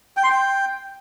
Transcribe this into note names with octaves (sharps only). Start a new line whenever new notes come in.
G5
C6
G5